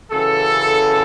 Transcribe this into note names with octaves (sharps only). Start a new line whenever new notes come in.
F#2 C#3 E3 A4